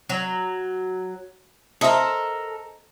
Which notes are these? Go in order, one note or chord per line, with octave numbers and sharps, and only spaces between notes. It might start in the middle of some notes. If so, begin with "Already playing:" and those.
F#3
A4 A#4 C5 D#5 E5